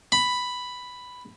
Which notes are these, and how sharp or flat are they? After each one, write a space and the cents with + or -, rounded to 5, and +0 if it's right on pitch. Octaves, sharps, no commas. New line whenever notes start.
B5 +5